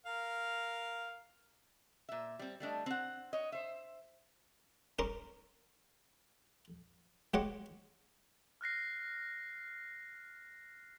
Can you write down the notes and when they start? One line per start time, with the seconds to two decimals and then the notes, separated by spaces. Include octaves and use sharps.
0.06 A#4 F5
2.09 A#2 E5
2.39 G3 C4
2.60 G3 A3 D4 D#5
2.86 C4 F#5
3.33 C#5 D#5
3.52 C5 E5
4.99 C#4 A#4 C6 D6
7.34 G#3 G4 C#5 F#5 D6
8.61 F6 F#6 A#6 C7